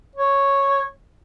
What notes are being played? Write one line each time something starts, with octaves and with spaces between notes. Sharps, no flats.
C#5